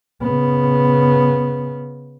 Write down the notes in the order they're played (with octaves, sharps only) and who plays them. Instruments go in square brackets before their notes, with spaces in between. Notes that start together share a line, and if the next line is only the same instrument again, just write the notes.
[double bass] C#3 B3